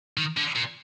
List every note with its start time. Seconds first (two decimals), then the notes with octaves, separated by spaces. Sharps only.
0.17 D#3
0.37 D3
0.55 A#2